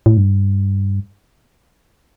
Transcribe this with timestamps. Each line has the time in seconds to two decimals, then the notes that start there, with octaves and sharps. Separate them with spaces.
0.06 A2
0.17 G2